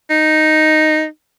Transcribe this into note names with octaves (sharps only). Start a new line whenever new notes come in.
D#4